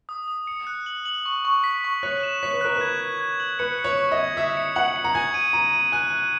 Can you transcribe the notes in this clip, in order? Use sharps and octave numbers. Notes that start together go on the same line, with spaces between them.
D#6
D#6
C#7
F#6
F#7
F#7
C#6
C#6
B6
C#6
C#5 F#6
E7
C#5 B6
B4
A#4 F#6
B4 G#6
G#6
G#6
F#7
B4 C#7
C#7
C#5
C#6
D#5
G#6
E5 D#6
C#7
F#5 F#7
C#7
A#5
G#5 G#6
D#7
A#5 D#7
D#7
G#5 F#6
F#6